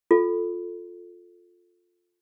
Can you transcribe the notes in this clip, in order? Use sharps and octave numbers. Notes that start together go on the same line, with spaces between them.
F4 A4